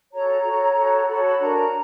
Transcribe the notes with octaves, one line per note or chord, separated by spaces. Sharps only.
F#4 A4 C#5 A#5
F#4 A4 C#5
F#4 A4 C#5
F#4 A4 C#5 B5
B5
D4 F#4 A#4 A#5